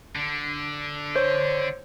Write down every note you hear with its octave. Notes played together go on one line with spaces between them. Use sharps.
D3
C5 C#5